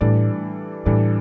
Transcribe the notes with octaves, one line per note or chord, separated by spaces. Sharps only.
A2 E3 G3 D4 A4 D5
A2 E3 G3 D4 A4 D5